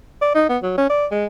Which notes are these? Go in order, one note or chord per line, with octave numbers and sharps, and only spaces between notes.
D5
D#4
B3
F#3
C#4
D5
G#3